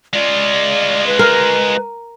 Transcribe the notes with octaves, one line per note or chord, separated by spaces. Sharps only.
G#3 F4 D5
B4
A#4